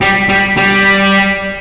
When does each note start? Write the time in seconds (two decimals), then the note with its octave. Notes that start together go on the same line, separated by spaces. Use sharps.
0.01 G3
0.29 G3
0.57 G3